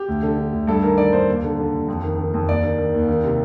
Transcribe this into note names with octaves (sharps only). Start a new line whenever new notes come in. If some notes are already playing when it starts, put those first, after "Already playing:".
Already playing: G4
D2
D3
D3
D2
G2 A4
D#3 A#4
D#3 D5
G2 C5
D#2
D3
D3
D#2
F2
D#3
D#3
F2
D#2 D5
D#3
D#3
D#2
D#3
C3